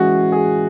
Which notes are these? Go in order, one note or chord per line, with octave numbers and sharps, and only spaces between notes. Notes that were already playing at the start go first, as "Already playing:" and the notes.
Already playing: E3 G#3 C#4 F#4 G#4
G#4